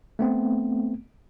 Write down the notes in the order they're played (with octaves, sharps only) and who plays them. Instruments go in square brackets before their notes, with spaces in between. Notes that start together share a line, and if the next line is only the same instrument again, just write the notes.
[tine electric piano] A3 B3 C4